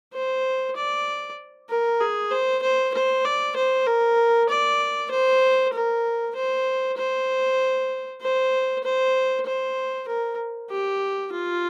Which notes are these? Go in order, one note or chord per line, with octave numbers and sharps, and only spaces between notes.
C5
D5
A#4
G#4
C5
C5
C5
D5
C5
A#4
D5
C5
A#4
C5
C5
C5
C5
C5
A#4
G4
F4